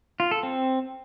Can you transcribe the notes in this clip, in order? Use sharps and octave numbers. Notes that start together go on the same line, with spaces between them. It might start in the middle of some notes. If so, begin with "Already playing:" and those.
F4
A4
C4